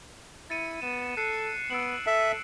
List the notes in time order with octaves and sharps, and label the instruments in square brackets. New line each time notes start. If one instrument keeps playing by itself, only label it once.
[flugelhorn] E4 [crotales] A6 C#7 D#7
[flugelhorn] B3 [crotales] E7
[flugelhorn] A4 [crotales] F#6 C7 C#7
[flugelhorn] B3 [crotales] E6 D7 F#7
[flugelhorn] A4 [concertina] E5